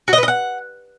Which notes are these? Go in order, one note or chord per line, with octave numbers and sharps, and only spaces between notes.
F#4
D#5
B4
D#5
F#5